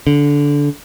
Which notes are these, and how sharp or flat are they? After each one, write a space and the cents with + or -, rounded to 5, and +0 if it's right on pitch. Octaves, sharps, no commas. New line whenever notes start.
D3 -20